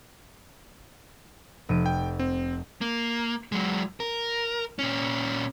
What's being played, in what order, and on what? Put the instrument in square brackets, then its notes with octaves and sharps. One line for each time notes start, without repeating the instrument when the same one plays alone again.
[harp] F1 D7 D#7
[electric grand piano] G5
C4
[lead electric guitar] A#3
F#3 G#3
A#4
A#2 C#4